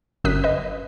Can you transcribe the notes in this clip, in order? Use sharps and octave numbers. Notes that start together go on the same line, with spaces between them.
G1 F#2 D#6 F#6 B6
B4 D#5